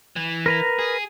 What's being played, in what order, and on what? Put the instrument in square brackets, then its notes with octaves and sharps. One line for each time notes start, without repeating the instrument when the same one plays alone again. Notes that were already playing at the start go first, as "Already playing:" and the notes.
[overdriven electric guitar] E3
[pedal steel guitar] A#4 B4 A#5
[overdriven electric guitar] G#4